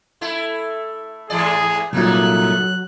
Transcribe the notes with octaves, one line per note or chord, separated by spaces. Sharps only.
A3 E4
G#2 E3 G#4 D5
C2 G2 A#2 F#3 A3 A#3 D#4 F#6